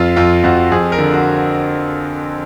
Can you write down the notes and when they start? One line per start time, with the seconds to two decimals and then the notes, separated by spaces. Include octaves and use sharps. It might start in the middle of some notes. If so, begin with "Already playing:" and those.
Already playing: F2 F4
0.16 F2 F4
0.44 F2 F#4
0.72 F2 G#4
0.92 A#4
0.98 D3
1.13 F#4